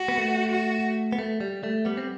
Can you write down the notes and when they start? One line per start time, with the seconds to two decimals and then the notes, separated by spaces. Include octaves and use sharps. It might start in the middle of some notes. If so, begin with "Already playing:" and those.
Already playing: F#4
0.08 B3
0.18 A3
0.51 F#4
1.12 B3
1.19 A3
1.40 G3
1.64 A3
1.85 G3 B3
1.97 C4